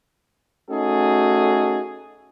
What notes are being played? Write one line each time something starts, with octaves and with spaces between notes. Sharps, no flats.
A3 C#4 D#4 F#4 G#4 A4